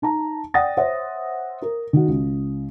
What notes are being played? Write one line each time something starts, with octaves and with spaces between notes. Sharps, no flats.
D#4 A5 A#5
D5 F#5 G5 D#6 A6 A#6
C5 C#5 E5 F#5
A#4
D#3 F#4
C#2